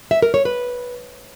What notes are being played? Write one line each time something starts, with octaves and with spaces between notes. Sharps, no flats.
E5
A#4
C#5
B4